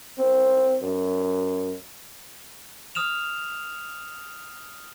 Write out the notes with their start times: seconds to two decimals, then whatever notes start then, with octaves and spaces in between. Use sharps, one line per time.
0.19 C4
0.82 F#2
2.95 D#6 F6 E7 F7